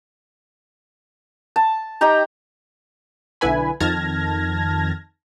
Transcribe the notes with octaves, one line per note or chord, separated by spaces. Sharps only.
A5
D#4 G4 G5 A#5
B1 D3 E4 B4 G#5 B5
F2 D#3 A5 F6 G#6 A#6